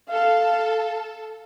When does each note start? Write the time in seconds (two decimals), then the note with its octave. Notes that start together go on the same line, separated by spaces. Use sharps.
0.11 A4 F5